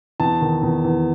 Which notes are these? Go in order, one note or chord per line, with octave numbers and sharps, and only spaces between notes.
E2 A5
D#3
E2
E2